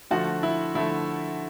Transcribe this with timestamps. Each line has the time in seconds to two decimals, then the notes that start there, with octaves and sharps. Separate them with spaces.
0.11 D3 F3 A3 F#4
0.43 E4
0.75 D3 F3 A3 E4